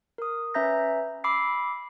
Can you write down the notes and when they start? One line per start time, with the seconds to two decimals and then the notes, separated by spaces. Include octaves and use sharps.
0.18 A#4 D#6
0.54 C#4 B4 E5 A#5 G6 A#6
1.24 B5 D6 E6 C7